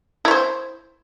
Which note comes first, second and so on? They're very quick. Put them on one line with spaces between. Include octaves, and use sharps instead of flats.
E4 C#5 C5